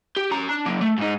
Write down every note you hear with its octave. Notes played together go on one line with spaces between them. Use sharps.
G4
C#4 A#5
D4
F#3 A#3
A3
G#2 D#4